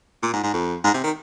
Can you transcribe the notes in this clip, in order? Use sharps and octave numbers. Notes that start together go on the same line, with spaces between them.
A#2
G#2
G#2
F2
G#2
C3
D#3